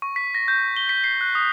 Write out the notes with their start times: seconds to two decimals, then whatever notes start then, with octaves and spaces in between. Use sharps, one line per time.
0.02 C#6
0.16 B6
0.35 A#6
0.48 G6
0.76 G7
0.89 B6
1.04 C7
1.21 F#6
1.35 D#6